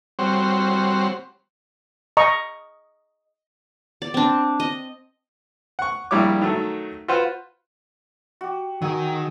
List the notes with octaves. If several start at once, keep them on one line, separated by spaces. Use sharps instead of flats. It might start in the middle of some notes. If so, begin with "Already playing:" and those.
G3 C4 F#4 C5 C#5
D#5 A#5 C#6
D5
C4 D4
D#5
F#5 C#6
A#1 G3 E4 C#5 D6
D#3 F#3 A3
F4 F#4 B4 C5 F#5
F#4 G4
D#3 F#3 G#4